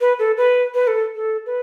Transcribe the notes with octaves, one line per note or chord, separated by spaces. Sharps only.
B4
A4
B4
B4
A4
A4
B4